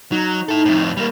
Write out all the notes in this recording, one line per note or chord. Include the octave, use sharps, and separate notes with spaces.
F#3 D#4
E4 A4
F2 A2
G3 A#3